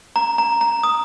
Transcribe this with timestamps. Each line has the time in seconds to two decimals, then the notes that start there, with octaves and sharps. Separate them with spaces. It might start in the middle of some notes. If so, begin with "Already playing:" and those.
0.16 A#5
0.38 A#5
0.61 A#5
0.83 D#6